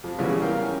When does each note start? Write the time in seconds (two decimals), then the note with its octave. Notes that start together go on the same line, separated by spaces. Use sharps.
0.04 F2 F3
0.18 A#2 C#3 E3 G3 G#3 B3
0.42 A#4 F5 G5
0.61 C#4